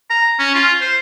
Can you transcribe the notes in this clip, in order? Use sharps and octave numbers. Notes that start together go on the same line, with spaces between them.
A#5
C#4
F4
C5